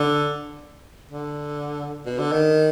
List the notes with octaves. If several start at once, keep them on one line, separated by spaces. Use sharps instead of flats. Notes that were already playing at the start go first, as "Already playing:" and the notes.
Already playing: D3
D3
B2
D3
D#3